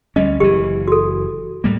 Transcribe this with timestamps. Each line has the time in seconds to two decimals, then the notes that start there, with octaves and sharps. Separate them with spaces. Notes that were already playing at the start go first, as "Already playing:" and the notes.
0.16 D2 G3 C#4 D#5
0.40 F#1 E3 G4
0.88 F#4 A4
1.64 A2 G3 A#3